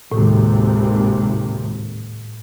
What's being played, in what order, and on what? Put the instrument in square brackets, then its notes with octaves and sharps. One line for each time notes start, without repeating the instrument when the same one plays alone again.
[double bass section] G#1 D#2 C3 [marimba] A2